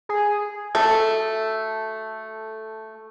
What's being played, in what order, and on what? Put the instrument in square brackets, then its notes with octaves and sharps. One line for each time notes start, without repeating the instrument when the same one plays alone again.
[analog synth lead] G#4
[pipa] A3 [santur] A4